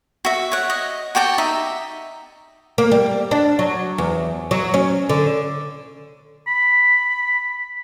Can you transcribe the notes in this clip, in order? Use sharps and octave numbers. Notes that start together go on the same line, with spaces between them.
F#4 E5
C#5 F#5
D#5
F#4 G4 G5 A5
D#4 E5
A#3
G3
D4
F#3
E2
F#3
C#4
D3
B5